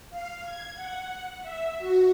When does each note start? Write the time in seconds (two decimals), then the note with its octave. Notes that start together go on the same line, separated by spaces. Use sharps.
0.10 F5
0.44 G#6
0.75 F#5
1.41 E5
1.79 F#4